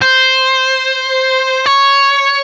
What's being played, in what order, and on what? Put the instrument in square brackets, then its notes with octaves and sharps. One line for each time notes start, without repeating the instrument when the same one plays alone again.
[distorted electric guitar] C5
C#5